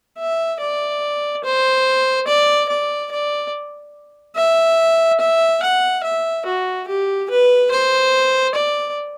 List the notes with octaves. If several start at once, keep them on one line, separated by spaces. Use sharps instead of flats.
E5
D5
C5
D5
D5
D5
E5
E5
F#5
E5
F#4
G4
B4
C5
D5